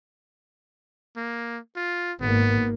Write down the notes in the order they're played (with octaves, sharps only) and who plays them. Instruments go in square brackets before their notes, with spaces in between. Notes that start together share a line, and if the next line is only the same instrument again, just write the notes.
[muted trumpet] A#3
F4
[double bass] G#1 A#3 [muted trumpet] B3